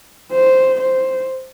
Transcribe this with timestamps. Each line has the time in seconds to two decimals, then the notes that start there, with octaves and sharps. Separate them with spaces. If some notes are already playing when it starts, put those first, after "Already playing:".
0.32 C5
0.81 C5